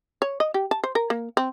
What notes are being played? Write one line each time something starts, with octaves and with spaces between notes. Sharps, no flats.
C#5
D#5
G4
A5
C5
A#4
A#3
C4